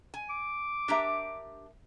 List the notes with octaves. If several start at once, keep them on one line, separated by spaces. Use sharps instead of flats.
G#5
D6
D4 G4 A#4 E5 A#5